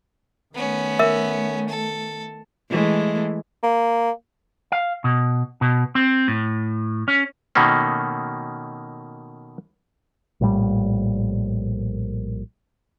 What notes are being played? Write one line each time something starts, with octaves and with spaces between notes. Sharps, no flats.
D#3 A3 B3 C#4
A#4 E5
A4
E3 G#3 A3
A#3
F5
B2
B2
C4
A2
C#4
B2 D#3 A3 A#3 C#4
A#1 A2 G3